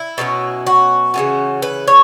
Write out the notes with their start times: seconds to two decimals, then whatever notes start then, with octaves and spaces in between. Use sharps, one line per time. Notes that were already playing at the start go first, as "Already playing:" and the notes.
Already playing: E4
0.18 B2 F#3 A3 C#4
0.67 F#4
1.14 C#3 E3 A3 C#4
1.62 B4
1.88 C#5